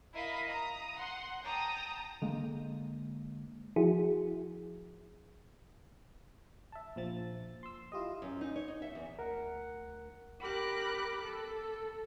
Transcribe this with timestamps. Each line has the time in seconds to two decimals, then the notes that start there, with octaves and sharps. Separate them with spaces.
0.13 E4 A#4 D#5 F5 B5 B6
0.48 A#5 D#6
0.97 F#5 C6
1.42 G5 A5 A#5 D#6
2.22 D3 G#3 A#3
3.76 F3 E4 F#4 G#4
6.72 E5 A5
6.96 A#1 F3 A6
7.63 C6 E6
7.92 E4 F4 G4 D#5
8.22 F#2
8.41 D#4
8.56 C#5
8.68 D#4
8.82 E5
8.95 E2
9.19 D2 A#4 F#5
10.40 G4 A#4 B5 D6 F#6
11.24 A4